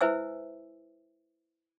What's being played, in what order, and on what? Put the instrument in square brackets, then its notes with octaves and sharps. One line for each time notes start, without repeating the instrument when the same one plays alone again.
[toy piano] E4 B4 C5 E5 G#5 E6